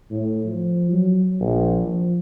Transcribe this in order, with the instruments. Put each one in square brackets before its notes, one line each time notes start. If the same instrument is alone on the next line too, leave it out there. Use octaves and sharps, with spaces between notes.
[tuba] A2
F3
F#3
A#1
F3